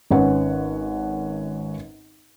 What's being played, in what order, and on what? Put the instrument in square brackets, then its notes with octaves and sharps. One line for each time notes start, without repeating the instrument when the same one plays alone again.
[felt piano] G#1 G#2 C#4 B4 F#5